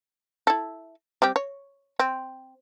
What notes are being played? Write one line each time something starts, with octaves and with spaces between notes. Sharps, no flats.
E4 A4
G3 C4 G4
C#5
C4